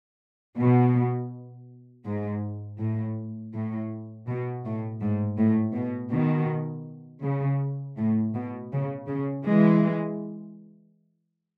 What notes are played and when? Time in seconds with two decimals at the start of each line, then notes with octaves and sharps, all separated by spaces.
0.58 B2
2.05 G#2
2.79 A2
3.54 A2
4.28 B2
4.65 A2
5.02 G#2
5.38 A2
5.75 B2
6.13 B2 D#3
7.23 C#3
7.97 A2
8.35 B2
8.72 C#3
9.08 C#3
9.45 E3 G#3